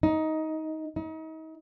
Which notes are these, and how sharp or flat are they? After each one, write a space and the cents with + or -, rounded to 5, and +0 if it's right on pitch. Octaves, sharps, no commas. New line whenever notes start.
D#4 +15
D#4 +35